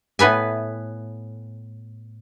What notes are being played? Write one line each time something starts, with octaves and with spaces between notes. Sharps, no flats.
A2 B3 B4 G#5